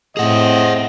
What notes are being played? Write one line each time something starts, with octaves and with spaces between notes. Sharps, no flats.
A2 C4 G#4 D#5 F#5